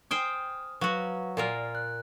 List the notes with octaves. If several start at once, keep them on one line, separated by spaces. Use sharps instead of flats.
C5 G5 G#5 D#6 F6
F#3 F#4 B4 F5
A#2 F4 A#4 D5 F6
F#6